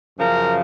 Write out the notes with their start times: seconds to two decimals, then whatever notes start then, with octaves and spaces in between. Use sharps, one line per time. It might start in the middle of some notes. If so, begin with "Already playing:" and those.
0.19 F#2 C#3 F3 A#4